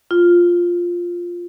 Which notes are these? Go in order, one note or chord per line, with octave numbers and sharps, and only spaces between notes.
F4